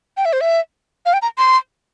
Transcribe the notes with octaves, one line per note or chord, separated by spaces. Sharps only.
G5
E5
C5
E5
F5
G5
A#5
C6